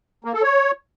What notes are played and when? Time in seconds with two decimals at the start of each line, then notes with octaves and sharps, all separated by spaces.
0.24 A#3
0.33 A4
0.42 C#5